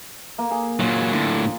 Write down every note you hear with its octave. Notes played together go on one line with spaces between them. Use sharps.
A#3
G#4
A#2 F#3 F4
A2 D3